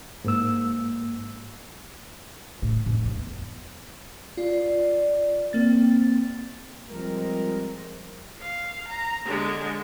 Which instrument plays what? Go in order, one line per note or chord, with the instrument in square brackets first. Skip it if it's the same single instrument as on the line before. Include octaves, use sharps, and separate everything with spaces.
[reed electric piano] G#2 A#3 E6
[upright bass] A2
F1
E2
[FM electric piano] F4 [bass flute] D5
[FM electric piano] A#3 A6 [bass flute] C4
[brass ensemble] F3 G3 G#3 C4 A#4
[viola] F5
A#5
D3 G#3